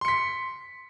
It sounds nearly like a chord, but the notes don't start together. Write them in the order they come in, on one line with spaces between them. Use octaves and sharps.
C6 C#7 B6